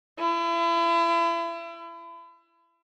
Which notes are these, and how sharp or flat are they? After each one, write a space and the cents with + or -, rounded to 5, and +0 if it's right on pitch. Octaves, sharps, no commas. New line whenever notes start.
E4 +35